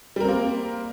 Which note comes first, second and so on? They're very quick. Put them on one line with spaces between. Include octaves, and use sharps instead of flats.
G3 A#4 C4 A#3